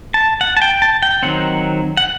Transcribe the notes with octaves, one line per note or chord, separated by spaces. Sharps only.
A5
F#5
A5
G5
A5
G5
D#3 F#3 C4 F#5
F#5